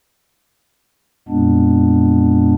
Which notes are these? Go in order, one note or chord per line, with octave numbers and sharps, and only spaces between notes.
F2 A#2 G#3 B3 D4